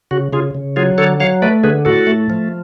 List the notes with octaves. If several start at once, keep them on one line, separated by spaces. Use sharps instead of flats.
C#3 F#4
C#3 F4 G#4
C#3
F#3 F4 G#4
D3 A4 C#5
F#3 C#5 F5
A3 B4 D5
D3 G#4 B4
A2 F#4 A4
A3
F3